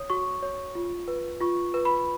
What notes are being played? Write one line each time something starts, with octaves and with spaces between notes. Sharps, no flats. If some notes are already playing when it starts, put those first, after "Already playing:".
Already playing: C#5 D#6
F#4 C#6
C#5
F4
B4
F4 C#6
B4
B5